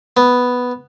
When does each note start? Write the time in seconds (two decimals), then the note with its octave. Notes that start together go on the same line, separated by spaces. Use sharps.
0.17 B3